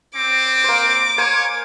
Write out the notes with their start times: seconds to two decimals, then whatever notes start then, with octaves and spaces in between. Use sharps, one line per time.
0.16 C4 D6
0.64 A#3 C5
1.18 A#3 C5 C#5 G#5